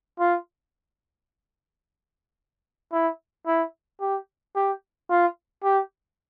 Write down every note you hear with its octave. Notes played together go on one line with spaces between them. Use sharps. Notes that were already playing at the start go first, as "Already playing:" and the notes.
F4
E4
E4
G4
G4
F4
G4